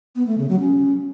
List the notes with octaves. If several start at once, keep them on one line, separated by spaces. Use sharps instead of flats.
B3
A3
C#3
F#3
C#4